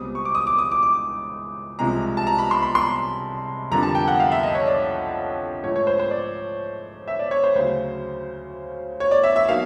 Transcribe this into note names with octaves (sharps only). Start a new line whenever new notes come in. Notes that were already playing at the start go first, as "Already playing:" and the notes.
Already playing: C#2 B2 G3 C4 D#6
C#6
D6
D#6
D6
D#6
D6
D6
C2 C3 F3 G#3 A#5
A5
A#5
B5
C6
B5
C6
F2 D3 G3 A#3 A#5
A5
G5
F#5
F5
E5
D#5
C#5
D5
G#2 F3 A3 C#5
C#5
C5
C5
D5
E5
D5
C#5
C5
D2 C#3 F#3 C5
C#5
D5
E5
E5
B2 F#3 A#3 D#4 F5